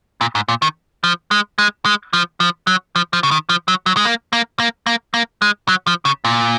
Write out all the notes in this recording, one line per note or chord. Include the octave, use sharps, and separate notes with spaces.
A#2
G#2
A#2
D#3
F3
G#3
G#3
G#3
F3
F3
F#3
F3
F3
C#3
D#3
F3
F#3
F#3
G#3
A#3
A#3
A#3
A#3
A#3
G#3
F#3
F3
C#3
A#2